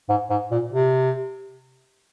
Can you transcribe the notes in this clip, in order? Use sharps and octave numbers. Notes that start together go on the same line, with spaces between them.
G#2
G#2
A#2
C3